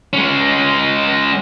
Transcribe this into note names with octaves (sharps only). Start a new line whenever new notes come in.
G#3 C#4